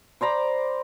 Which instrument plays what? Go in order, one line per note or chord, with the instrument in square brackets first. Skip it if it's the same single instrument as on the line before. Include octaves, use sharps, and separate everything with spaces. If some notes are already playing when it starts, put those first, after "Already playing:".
[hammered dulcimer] C5 D5 A#5 B5